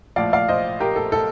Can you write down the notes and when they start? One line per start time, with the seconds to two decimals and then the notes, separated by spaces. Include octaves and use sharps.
0.16 A#1 A2 F3 D5 F5
0.33 D5 F5
0.48 C5 D#5
0.80 G4 A#4
0.96 A4
1.12 A4